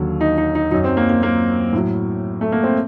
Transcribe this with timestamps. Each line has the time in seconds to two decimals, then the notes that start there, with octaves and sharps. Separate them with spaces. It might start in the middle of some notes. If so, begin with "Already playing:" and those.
Already playing: D#2 D3 F#3
0.21 D#4
0.38 D#4
0.55 D#4
0.71 F#3 D#4
0.74 F#2
0.84 C4
0.97 A#3
1.10 A#3
1.23 A#3
1.73 A2 F#3
2.41 A3
2.52 A#3
2.64 C4